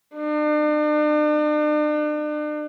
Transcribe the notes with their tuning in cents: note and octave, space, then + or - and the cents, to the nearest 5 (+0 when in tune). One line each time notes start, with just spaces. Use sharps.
D4 +40